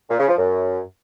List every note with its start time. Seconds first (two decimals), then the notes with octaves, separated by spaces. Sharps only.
0.10 A#2
0.19 C#3
0.28 F3
0.37 F#2